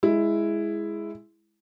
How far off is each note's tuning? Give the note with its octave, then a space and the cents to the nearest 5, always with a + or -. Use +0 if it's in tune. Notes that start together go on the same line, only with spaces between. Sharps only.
G#3 +0 E4 +5